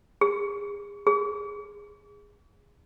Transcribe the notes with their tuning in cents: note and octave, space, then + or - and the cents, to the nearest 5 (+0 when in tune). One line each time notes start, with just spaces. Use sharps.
G#4 -35
G#4 -20